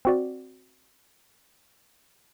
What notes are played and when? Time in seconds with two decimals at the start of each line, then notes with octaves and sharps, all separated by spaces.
0.05 C4 F#4 D5